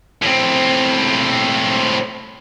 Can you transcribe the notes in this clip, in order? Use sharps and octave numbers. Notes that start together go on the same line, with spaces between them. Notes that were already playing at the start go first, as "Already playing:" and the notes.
A2 C4